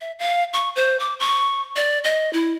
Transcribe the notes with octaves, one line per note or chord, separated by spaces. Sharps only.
E5
F5
C#6
C5
D6
C#6
D5
D#5
E4